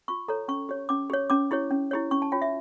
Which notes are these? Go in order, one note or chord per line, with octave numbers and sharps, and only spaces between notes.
F4 C#6
A4 C#5 A#5
C#4 C#6
G4 C#5
C#4 D6
G4 C#5
C#4 D6
E4 G4 C#5
C#4
E4 G4 C#5
C#4 C#6
A5
F4 C#5 G5
E5